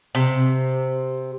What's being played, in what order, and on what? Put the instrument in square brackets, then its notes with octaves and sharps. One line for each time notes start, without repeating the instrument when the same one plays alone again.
[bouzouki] C3